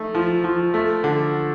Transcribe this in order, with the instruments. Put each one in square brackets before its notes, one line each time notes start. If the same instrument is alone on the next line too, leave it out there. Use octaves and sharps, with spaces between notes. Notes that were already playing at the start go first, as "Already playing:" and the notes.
Already playing: [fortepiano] A3 D#4
F3
F3
A3
D3